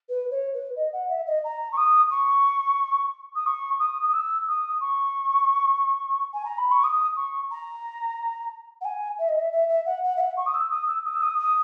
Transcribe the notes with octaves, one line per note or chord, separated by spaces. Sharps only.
B4
C#5
B4
D#5
F#5
E5
D#5
A#5
C#6
D#6
C#6
D#6
C#6
D#6
D#6
E6
D#6
C#6
G#5
A#5
B5
C#6
D#6
C#6
A#5
F#5
G#5
E5
D#5
E5
E5
E5
F#5
F#5
E5
F#5
C#6
D#6
E6
D#6
E6
D#6
E6
D#6
D#6